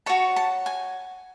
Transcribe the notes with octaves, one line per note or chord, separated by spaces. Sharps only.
F#4 C#5 A5
A5
G#5